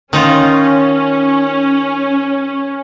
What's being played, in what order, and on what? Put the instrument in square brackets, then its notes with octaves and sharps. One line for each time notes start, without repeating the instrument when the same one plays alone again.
[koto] D#3 D#4 F4 [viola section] C#4